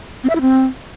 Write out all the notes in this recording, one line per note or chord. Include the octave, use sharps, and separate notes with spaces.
C4
E5
E4
C4